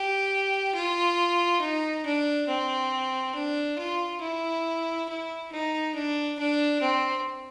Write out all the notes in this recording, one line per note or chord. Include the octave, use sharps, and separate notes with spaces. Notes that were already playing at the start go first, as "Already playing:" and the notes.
Already playing: G4
F4
D#4
D4
C4
D4
F4
E4
E4
D#4
D4
D4
C4